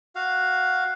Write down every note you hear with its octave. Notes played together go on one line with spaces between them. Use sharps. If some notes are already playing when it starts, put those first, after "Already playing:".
F#4 F5